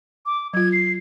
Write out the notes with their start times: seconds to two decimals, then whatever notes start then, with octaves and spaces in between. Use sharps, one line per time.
0.26 D6
0.54 F#3 F4 G#6
0.73 C7